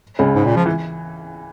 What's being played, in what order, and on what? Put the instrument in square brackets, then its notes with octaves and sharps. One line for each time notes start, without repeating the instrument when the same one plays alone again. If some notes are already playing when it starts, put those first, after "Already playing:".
[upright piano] C#2 C#3
[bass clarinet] G#2
A#2
F3
[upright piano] E3